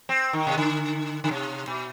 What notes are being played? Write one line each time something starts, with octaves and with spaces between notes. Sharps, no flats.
C4
D#3
C3
D3
D3
C3
B2